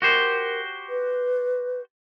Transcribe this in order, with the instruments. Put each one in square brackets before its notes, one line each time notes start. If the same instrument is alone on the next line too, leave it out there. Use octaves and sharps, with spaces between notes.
[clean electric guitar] F#4 G4 C5 [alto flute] A#4
[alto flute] B4